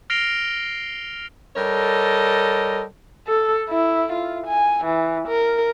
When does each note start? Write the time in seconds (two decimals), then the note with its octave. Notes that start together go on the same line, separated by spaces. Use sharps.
0.10 F6 A#6 C7 D7 F7 G7
1.56 G3 A4 A#4 C#5 D#5
3.27 A4
3.70 E4
4.12 F4
4.47 G#5
4.85 E3
5.28 A#4